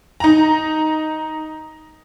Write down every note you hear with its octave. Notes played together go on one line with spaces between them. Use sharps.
D#4 A#5